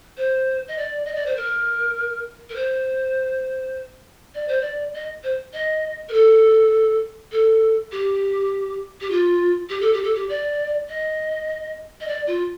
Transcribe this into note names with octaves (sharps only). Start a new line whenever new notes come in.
C5
D#5
D5
D#5
D5
C5
A#4
A#4
C5
D5
C5
D5
D#5
C5
D#5
A#4
A4
A4
G4
G4
F4
G4
A4
G4
A4
G4
D5
D#5
D#5
D5
F4